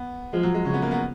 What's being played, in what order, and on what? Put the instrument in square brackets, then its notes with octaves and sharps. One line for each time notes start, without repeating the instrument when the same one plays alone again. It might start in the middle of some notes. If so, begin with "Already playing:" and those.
Already playing: [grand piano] B3
[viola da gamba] F3 [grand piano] G#3
[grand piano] F#3
G#3
[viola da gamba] C#3 [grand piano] C#4
[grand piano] B3
A#3
B3